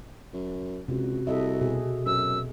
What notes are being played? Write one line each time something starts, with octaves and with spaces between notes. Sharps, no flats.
F#2
C#2 C3 F#4
C2 A4 D#5 E5
B2 G#4
F#2 E6